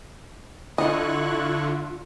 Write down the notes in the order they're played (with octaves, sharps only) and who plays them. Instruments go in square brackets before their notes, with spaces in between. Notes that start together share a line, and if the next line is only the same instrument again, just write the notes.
[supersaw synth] D3 [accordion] E4 C#6 F#6 [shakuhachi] F4 [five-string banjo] D#5